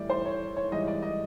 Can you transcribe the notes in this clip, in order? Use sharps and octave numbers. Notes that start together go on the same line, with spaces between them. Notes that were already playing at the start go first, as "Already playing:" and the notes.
Already playing: A2 E3 G3 D5
C5
C#5
C#5
G#2 E3 G3 D#5
D5
D#5